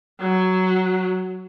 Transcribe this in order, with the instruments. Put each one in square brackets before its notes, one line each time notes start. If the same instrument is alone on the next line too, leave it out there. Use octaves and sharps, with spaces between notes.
[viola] F#3